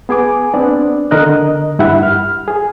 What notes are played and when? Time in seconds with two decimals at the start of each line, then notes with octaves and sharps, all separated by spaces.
0.09 B3 G#4 G#5 D6
0.54 B3 C4 D4 D5
1.11 D3 A#4 D#5 F#6
1.79 G2 E4 G4 E5 F#5 B5
2.03 F6
2.48 G#4